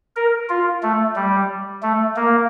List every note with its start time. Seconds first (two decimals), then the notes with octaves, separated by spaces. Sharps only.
0.16 A#4
0.49 F4
0.83 A3
1.16 G3
1.83 A3
2.16 A#3